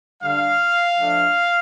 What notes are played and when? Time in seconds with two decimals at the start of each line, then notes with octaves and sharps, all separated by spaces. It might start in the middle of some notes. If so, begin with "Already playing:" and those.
0.21 D3 G3 D4 F5
0.99 F3 A3 D4